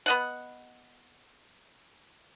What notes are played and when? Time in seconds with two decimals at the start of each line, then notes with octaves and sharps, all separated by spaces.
0.06 B3 D#5 F#5